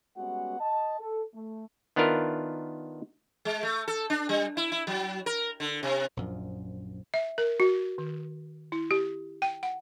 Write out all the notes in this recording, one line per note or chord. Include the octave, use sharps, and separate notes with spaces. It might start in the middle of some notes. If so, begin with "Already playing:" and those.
G3 G#3 B3 C#4 F#4 F#5
D#5 A5
A4
A3
D#3 B3 D4 E4 F4 A#4
G#3
A3
A4
D4
G3
E4
E4
F#3
A#4
D3
C3
A#1 F#2 F3
E5
A#4
F#4
D#3
E4
G4
G5
F#5